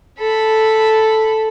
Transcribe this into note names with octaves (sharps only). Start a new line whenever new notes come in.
A4 B5